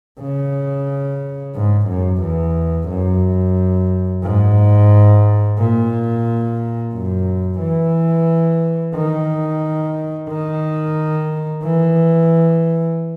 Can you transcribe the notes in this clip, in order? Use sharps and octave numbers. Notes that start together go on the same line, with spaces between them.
C#3
G#2
F#2
E2
F#2
G#2
A#2
F#2
E3
D#3
D#3
E3